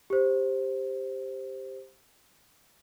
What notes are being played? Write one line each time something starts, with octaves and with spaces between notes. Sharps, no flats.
G4 C5